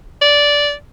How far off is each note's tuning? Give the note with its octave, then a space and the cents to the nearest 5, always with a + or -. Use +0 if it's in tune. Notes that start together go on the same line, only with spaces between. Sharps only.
D5 -10